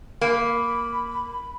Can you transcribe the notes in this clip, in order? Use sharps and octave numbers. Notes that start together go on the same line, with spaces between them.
A#3 B5